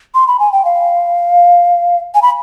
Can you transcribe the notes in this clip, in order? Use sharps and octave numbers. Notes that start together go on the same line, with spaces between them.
C6
B5
G#5
G5
F5
G#5
B5